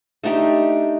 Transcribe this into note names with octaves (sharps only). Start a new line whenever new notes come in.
A3 D4 D#4 G4